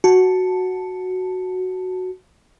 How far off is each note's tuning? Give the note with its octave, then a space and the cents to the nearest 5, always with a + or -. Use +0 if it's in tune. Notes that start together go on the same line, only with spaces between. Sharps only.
F#4 +0 A5 +0